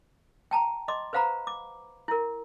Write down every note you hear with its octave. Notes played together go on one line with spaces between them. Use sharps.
G5 A5 A#5
D#5 C6 D6
B4 C5 F5 F#5 A#5 B5
D6
E4 A#4